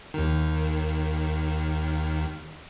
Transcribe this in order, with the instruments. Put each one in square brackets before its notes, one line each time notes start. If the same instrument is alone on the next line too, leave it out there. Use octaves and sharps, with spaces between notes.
[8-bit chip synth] D#2 D#3